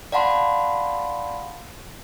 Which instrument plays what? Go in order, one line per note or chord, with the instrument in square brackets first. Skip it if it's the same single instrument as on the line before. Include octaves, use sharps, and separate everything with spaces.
[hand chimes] D5 F5 F#5 A5 B5 C6